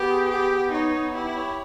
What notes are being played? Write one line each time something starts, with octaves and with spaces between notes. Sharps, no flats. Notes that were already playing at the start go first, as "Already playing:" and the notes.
Already playing: B3 G4
G#4
B3 G4
B3
D#4 C#5
B3
E4 G4
C#5